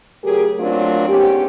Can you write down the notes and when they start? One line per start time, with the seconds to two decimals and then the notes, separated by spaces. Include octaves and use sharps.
0.23 C#3 F#3 A3 G4 G#4 A#4
0.58 F#3 A3 A#3 C4 D4 F4
1.07 G#2 B3 C#4 G4